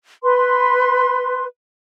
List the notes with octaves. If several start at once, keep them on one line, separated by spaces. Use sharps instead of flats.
B4 C6